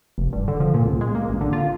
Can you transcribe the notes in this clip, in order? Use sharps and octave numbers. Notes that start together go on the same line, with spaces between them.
F1
G2
D3
F3
A#2
C#2
G#3
A#3
A1
D3
F4